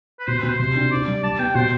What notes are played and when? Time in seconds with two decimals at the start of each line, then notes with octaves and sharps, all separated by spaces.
0.19 B4
0.27 B2 C5
0.37 B4
0.43 B2 C5
0.59 C3 C5
0.75 D4
0.91 D4 D5
1.07 G3
1.23 G3 A5
1.39 B3 G5
1.55 B2 C5